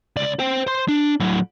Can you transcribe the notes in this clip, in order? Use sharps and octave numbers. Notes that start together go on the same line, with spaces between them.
C#2 D5
C5 G5
C5 C6
D4
A2 F#3